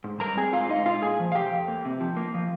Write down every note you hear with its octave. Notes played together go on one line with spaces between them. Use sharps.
G#2
G3 A#4 A#5
C4 G#4 G#5
G#2 F4 F5
G#3 D#4 D#5
A#2 F4 F5
A#2 G#4 G#5
F3
F5
C3 G4 G5
F2
A#3
C3
F3
A#3
F3